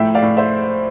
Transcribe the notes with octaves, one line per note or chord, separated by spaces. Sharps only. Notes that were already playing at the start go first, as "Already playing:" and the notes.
Already playing: A2 F3 E5 G5
D5 F5
A2
C5 E5